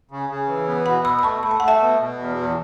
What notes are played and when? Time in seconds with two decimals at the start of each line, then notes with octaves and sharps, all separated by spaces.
0.11 C#3
0.30 C#3
0.48 E3
0.67 B3
0.86 B2 F#5 B5
1.05 B2 B5 E6
1.19 B5
1.23 A3 A5 C#6
1.43 A3 B5
1.51 A5
1.60 A3 F#5
1.68 E5 A5
1.80 B2
1.99 B2
2.19 E2
2.36 E2